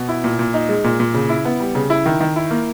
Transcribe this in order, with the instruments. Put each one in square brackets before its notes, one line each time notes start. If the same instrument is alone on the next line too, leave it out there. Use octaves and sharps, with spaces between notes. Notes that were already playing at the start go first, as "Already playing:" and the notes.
Already playing: [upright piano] B2
E4
A#2
A#2
D#4
G#3
A#2
A#2
C#3
E4
B3
G3
C#3
E4
D#3
D#3
E4
A#3